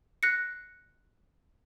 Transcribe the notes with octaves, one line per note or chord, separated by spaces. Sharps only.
F#6 A#6 C7 C#7